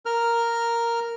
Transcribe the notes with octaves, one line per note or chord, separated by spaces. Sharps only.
A#4 F6